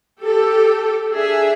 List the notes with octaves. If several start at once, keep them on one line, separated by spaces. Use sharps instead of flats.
G4 A4
D4 G#4 E5